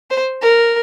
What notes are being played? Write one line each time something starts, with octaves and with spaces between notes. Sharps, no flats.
C5
A#4